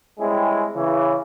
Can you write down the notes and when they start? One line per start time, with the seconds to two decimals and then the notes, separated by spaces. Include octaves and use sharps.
0.20 G3 G#3 C4 C#4 E4 G#4
0.75 C#3 E3